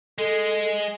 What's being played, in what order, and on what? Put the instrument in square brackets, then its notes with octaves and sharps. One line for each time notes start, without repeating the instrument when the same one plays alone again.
[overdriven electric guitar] G#3 [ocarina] A4